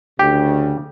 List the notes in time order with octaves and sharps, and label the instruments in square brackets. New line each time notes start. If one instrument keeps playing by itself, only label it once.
[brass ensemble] D2 C#3 [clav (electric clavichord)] G4